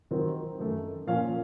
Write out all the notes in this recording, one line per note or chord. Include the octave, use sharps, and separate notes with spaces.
D#3 F#3 C4 D#4
F#2 D#3 A3
A#2 F3 A#3 C#4 F5